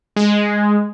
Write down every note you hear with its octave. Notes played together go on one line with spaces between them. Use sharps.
G#3